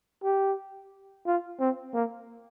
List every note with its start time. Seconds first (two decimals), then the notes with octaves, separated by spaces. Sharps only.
0.24 G4
1.26 F4
1.60 C4
1.94 A#3